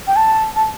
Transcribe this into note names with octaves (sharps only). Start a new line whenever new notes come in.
G5
A5
A5